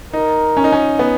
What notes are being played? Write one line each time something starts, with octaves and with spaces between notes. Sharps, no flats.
D#4 A#4
C#4
D#4
C#4
B3